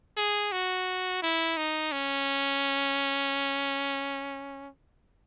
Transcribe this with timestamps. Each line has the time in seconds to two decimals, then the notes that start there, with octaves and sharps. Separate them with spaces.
0.17 G#4
0.52 F#4
1.23 E4
1.57 D#4
1.92 C#4